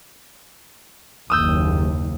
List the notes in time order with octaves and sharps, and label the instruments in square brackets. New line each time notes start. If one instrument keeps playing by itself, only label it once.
[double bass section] F#1 D#2 [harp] D#6 E6 G6